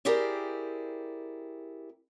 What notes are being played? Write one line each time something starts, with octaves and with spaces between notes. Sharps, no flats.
C4 E4 G4 G#4 A#4 D5